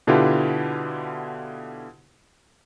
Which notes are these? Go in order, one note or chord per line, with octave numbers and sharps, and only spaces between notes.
B2 D3 E4 F4 G4 B4